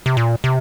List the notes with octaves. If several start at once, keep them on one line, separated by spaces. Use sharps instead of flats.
C3
A#2
C3